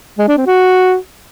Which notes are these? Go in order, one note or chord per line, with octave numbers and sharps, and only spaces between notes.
G#3
D4
C4
F#4